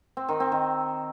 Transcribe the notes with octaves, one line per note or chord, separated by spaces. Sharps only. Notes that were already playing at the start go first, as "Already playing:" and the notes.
C4
D#3
C4
D#3